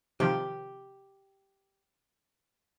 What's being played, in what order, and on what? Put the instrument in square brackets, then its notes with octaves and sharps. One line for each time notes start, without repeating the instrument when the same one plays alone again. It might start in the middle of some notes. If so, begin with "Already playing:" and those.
[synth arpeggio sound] C3 D#3 F3 [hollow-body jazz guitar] G4